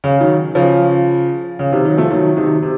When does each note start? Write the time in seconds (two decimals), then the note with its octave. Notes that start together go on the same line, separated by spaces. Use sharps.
0.04 C#3
0.20 D#3 F#3
0.55 C#3 F3
1.59 C#3
1.72 C3 D#3
1.85 D#3 F#3
1.97 F3 A3
2.11 D#3 F#3
2.36 C3 D#3
2.62 C3